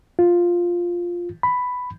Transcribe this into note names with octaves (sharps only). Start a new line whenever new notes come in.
F4
B5